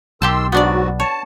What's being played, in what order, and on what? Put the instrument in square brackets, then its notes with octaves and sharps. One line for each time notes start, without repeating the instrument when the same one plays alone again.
[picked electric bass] B1 [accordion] D#3 C6 E6 [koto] G4 G5 A5
[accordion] G#2 F#3 F#4 [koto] B3 D4 D5
[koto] C#5 [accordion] A5